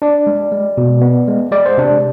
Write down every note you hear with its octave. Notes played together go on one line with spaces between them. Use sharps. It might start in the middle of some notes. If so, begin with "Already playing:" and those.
D4 D5
G#3
G#3
B2
B3
G#3
G#3 D5
C5
C3 D4 D5